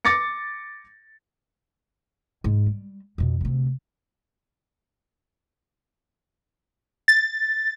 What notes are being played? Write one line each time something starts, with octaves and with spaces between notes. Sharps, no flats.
D6 A6 A#6 C#7
G#2
G3
F2 B2
D2 C3
A6